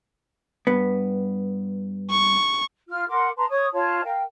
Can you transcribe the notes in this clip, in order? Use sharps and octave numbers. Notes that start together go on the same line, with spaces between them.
G2 B3
C#6
F4 F6
A#4 F#5 C6 D6
B4 A5 A#5 C6
C#5 C#6 D#6
F4 C#5 A5
A#4 F5 G5